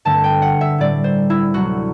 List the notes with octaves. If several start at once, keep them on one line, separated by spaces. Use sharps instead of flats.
G2 D3 A3 C4 A5
G5
F#5
E5
A2 G3 C4 D5
C5
E4
D2 C3 F#3 F#4